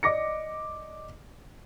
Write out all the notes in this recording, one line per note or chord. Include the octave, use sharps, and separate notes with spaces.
D5 D#5 D6 A#6 C#7